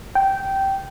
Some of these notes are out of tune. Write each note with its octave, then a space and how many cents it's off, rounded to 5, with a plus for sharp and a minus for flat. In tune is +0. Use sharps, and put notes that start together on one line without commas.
G5 -15